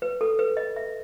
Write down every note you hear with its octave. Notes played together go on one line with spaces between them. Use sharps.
B4
A4
B4
D#5
E5